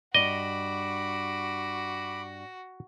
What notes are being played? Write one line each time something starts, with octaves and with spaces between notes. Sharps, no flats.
G2 F#4 D5 D#5 B5 D6